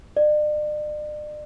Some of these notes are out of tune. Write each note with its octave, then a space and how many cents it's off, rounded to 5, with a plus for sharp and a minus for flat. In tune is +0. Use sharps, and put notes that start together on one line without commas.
D5 +40